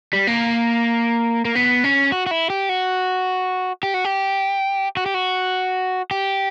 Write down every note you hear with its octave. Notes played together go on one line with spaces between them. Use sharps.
G3
A#3
A#3
B3
C#4
F#4
F#4
E4
G4
F#4
G4
F#4
G4
F#4
G4
F#4
G4